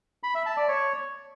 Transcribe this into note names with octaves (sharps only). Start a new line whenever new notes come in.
B5
E5
A5
D5
C#5